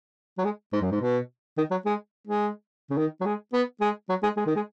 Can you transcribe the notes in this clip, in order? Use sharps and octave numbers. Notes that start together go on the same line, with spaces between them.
F#3
G#3
G#2
F#2
G#2
B2
D#3
F#3
G#3
G#3
C#3
D#3
F#3
G#3
B3
G#3
F#3
G#3
G#3
D#3
G#3